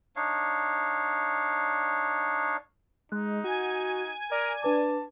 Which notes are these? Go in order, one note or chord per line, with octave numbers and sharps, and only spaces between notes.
D4 D#4 C#5 F5
G#3 D#4 F#6
F#4 G#5
A#4 D5
D4 B4 A5 D6